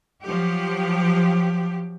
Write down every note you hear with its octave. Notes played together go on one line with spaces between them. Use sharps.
F3 F#3 G4